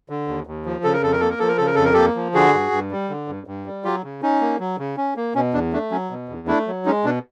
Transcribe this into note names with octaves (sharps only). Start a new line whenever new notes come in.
D3
D#2
D#2
F3
C#3 A4
A#4
F2 A4
A#4
A#3 A4
A#4
F3 A4
A#4
C#3 A4
A#4
F2 A4
A#4
A#3 G4 A4
F3
D3 F#4 G#4
G2
G2
G3
D3
G2
G2
G3
F#3 F4 G4
C#3
C#4 D#4
A#3
F#3
C#3
C#4
A#3
B2 C#4
E2 D4
A3 D4
F#3 C#4
B2
E2
A3 D4 E4
F#3
G#3 C#4 D#4
B2 D4